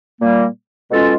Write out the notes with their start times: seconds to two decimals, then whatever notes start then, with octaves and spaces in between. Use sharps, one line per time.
0.20 A#2 G3 A#3
0.90 B2 G#3 C#4 F4 A4